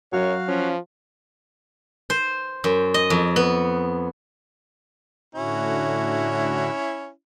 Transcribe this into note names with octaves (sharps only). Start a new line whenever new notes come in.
F#2 F#3 F#4 C#5 F5
F3 C#4
C5
F#2
D#5
F2
B3
A2 D3 C#4 E4 F#4